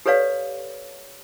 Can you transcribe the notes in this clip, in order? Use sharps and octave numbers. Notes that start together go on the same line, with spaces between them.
G4 A4 B4 C#5 D5 F5